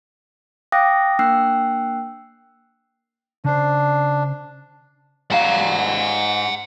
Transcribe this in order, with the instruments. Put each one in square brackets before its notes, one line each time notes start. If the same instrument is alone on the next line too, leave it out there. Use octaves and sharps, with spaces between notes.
[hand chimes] F5 G5 D6 D#6 F#6 A#6
A#3 D4 G5 E6 F#6 C7
[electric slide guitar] C#3 C5 [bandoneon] D4
[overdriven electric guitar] G#2 F5 [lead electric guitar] F#5 A#5